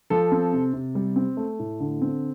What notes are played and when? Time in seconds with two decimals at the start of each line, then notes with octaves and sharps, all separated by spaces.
0.10 F3 A4
0.32 C4
0.53 C3
0.73 C3
0.95 G3
1.16 C4
1.37 A3
1.59 A2
1.80 D3
2.01 C4